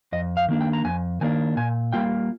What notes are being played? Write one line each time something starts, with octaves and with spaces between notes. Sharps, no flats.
F2 D#5
F5
D#3 A#3 D4
G5
A#5
F2 G#5
D#3 A#3 D4 G#5
A#2 G#5
G3 A#3 F4 G5